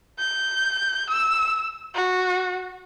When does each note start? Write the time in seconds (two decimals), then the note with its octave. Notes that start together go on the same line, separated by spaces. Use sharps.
0.19 G6
1.10 E6
1.94 F#4